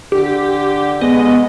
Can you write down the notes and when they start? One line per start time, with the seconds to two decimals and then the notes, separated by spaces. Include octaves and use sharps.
0.12 D3 G4
1.01 G#3 B3 D#5